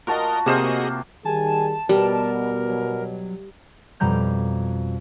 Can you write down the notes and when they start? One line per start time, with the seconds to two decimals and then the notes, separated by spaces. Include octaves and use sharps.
0.07 F4 F#4 A#4 D#5 A5
0.46 C3 A#3 F#4 G#4 A#4 C5 D#5 E7
1.25 D#3 G3 G#4 G#5 A5
1.89 B2 G3 A#4
2.69 F#3
4.00 F2 B2 G3 A#5 G6